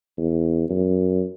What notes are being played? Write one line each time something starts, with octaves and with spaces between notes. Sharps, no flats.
E2
F#2